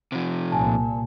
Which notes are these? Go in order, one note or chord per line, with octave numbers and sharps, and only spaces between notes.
C3 F3
C2 A#2 G#5 A5